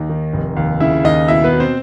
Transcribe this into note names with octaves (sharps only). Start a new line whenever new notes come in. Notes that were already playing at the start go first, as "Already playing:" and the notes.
Already playing: D#2 D#4
D#3
F1
D#2
C#3 E4 E5
D#2 D#4 D#5
B2 E4 E5
B3 B4
B2
C4 C5